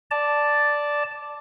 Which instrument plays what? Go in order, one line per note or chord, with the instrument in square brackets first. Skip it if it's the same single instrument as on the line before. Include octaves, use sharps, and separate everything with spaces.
[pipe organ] D5 A5